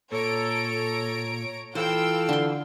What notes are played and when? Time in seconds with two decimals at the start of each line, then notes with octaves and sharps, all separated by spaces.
0.12 A#2 A4 C#5 A#5 D7
1.75 E3 F4 A4 C5 F5 G5 E6
2.29 D3 C6